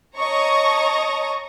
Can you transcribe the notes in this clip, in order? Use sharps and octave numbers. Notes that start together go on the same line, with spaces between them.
C#5 D#5 A5 A#5 C#6 D#6